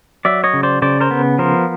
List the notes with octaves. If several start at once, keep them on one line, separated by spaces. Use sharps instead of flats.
F#3 D5 E5
C#5 D#5
C#3
C5 D5
C#3 C5 D5
A#4 C5
B3
F3 A#4 C5